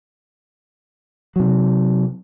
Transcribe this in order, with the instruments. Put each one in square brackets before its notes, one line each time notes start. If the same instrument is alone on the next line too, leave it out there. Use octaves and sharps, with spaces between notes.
[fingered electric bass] C3 F#3